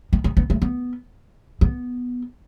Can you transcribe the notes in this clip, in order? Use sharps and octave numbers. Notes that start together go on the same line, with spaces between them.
B3
B3
B3
A3
B3
B3